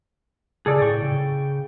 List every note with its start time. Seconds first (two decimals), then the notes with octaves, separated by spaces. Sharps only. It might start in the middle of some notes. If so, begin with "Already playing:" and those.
0.66 C#3 G#4 A4 D5
0.82 A2 G5 C#6
1.02 C#3